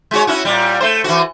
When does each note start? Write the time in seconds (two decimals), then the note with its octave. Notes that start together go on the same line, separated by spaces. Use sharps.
0.11 G#3 F#4 C#5
0.27 C#4 E4 F#4
0.45 A#2 G3
0.80 A3 C5
1.04 E3 F#4